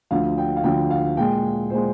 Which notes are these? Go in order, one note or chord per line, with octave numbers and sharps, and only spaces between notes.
D2 D3 F3 F5
G5
F5
D2 D3 F3 G5
F5
A#2 G#3 G5
A#2 G#3 C5